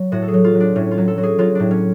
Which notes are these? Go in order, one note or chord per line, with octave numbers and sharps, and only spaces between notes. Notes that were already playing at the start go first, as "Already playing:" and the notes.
Already playing: F#3
A2 F#4
A4
G#4
F#3
F4
F#3
D4
A2 C#4
F4
F#3
A4
F#3 F#4
G#4
F#3 F4
A2 D4
C#4